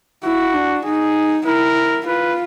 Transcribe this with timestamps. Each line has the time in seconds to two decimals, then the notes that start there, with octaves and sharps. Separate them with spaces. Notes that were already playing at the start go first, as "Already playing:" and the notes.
0.24 E4 F#4
0.54 D4
0.85 D#4 G#4
1.45 E4 A#4
2.07 F4 B4